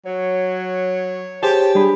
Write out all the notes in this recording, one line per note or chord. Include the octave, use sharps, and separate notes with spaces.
F#3 C#5
G4 G#4 C5 A5
G3 D4 G#4 B5